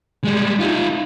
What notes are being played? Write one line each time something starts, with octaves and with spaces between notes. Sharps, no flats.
G3 G#3
D#4 F4